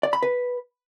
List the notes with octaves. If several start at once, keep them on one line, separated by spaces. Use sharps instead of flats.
D5
B5
B4